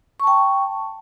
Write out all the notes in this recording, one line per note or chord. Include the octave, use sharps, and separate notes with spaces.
G5 A5 C#6